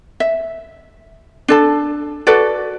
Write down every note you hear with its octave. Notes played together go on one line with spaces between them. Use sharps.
E5
D4 A4 A5
F#4 A4 B4 D5